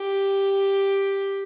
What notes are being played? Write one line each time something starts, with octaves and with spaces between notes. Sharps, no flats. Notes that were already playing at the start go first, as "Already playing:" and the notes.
Already playing: G4